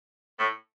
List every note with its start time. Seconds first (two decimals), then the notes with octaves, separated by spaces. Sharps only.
0.39 A2